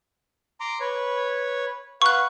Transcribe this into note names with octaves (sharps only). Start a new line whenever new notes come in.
A#5 C6 D6
B4 C#5
B4 F5 F#5 C#6 F#6